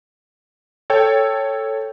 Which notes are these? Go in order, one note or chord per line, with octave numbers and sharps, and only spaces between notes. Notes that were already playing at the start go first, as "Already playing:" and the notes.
A4 C#5 G5